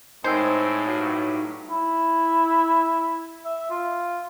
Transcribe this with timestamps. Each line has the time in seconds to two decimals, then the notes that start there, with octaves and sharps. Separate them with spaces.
0.24 A2 G#3 C4 D#4 C5 E6
0.86 G2 F#3
1.70 E4
3.45 E5
3.71 F4